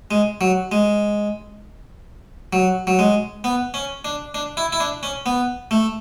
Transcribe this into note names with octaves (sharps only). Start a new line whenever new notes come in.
G#3
F#3
G#3
F#3
F#3
G#3
B3
C#4
D4
D4
E4
E4
D4
C#4
B3
A3